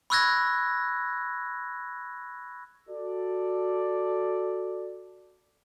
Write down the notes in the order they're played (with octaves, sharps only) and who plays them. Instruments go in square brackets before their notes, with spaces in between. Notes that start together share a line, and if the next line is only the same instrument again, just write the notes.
[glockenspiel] B5 C#6 E6 F#6 G#6 A#6
[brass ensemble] F#4 A4 D5